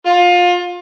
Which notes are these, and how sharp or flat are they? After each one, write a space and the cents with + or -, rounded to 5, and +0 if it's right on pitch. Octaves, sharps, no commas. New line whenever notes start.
F4 +25